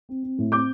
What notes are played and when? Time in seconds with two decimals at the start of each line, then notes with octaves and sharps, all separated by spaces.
0.09 C4
0.23 C4
0.38 A2
0.52 C4 D6 G6